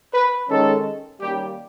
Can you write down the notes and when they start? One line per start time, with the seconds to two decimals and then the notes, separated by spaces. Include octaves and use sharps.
0.14 B4
0.49 D#3 G#3 C#4 A4
1.20 D#3 G3 A#3 C#4 G4